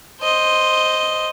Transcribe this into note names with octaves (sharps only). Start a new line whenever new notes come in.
C5 D#5